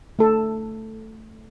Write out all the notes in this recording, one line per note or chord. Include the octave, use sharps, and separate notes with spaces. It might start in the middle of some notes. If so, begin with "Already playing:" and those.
A3 A4